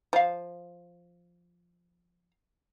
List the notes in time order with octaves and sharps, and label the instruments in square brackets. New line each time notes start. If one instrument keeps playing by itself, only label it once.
[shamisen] F3 F5